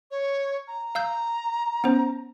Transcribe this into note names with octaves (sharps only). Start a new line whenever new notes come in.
C#5
A#5
F5 E6 G6
B3 C#4 C5